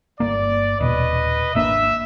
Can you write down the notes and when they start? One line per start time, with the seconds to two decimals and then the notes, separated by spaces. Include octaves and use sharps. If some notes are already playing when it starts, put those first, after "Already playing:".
0.20 G1 F#2 A#3 D5
0.81 D#1 B2 B4 D#5
1.55 G#1 A#3 D4 E5